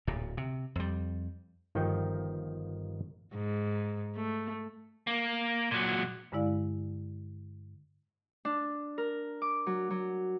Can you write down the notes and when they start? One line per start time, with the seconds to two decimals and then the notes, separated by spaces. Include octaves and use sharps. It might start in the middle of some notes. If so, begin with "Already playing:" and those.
0.07 D1 A#2
0.37 C3
0.75 F2 G3
1.75 G1 D#3 F3 D#4 G5
3.34 G#2
4.16 A3
5.07 A#3
5.71 A#2 F#3
6.32 G2 D3 G#3 E4 D5 F5
8.45 D4
8.98 A#4
9.42 D6
9.66 F#3
9.90 F#3